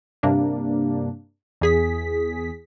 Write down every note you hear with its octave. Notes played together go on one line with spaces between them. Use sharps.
G2 C3 A#3 D4
E2 G#4 B6